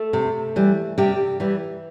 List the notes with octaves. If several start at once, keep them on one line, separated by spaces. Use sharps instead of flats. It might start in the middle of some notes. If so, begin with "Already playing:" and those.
Already playing: A3 A4
C3
E3 G3
C3 G3 G4
E3 G3